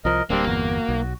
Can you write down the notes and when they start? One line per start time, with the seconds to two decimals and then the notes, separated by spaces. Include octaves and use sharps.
0.05 C2 F3 A#4 D#5
0.30 D1 G3 A#3 C4 D4
0.47 G1 E2 F#4
0.89 B1